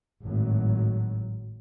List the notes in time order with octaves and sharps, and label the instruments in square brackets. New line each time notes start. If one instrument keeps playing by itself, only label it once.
[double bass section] G#1 A2 F#3